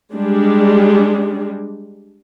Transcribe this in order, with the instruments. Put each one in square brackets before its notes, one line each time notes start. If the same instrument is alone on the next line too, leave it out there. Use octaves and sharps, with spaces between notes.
[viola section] G3 G#3 D4